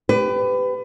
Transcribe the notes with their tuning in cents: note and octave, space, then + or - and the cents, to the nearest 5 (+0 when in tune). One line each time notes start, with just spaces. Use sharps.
G4 +10 B4 +25